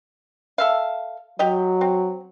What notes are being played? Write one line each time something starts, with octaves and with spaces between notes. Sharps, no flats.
A4 E5 F5
F#3 G4 D#5
C4